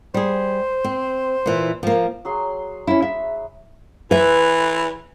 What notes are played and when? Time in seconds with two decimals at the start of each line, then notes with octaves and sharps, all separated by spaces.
0.14 G3 G#4 C5
0.84 C4
1.46 A#2 E3
1.83 F3 A#3
2.25 F#3 G#4 C6
2.87 C#4 E4
3.02 E5
4.11 E3 B4 E5